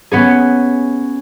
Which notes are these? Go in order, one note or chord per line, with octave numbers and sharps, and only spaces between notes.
B3 C#4 G#4